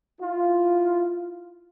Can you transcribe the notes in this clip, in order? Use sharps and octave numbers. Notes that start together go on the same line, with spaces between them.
E4 F4